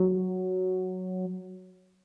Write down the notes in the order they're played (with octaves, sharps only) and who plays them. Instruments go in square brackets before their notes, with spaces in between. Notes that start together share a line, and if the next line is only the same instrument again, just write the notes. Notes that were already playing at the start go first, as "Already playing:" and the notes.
Already playing: [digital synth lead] F#3